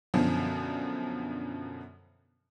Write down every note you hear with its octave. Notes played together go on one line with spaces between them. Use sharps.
F#2 B2 D3 F3